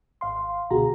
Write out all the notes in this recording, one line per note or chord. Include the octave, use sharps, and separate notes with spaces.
G#1 F5 C6
C#2 B2 D3 F#4 G#4 A#5